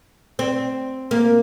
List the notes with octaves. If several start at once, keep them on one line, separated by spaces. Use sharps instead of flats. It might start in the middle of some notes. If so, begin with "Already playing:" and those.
C4
A#3